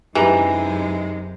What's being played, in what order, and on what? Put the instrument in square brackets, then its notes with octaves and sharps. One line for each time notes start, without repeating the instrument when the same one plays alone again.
[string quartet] F#2 C3 G#3 [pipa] E3 [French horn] D#4 [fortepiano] G4 A#5